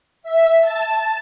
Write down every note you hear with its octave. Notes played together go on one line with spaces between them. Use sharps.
E5
A5